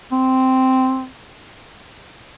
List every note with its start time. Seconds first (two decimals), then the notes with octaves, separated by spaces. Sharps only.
0.12 C4